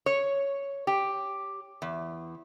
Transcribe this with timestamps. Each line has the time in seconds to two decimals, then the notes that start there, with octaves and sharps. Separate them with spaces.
0.06 C#5
0.87 G4
1.82 E2